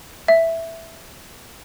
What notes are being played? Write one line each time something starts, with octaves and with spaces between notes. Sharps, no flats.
E5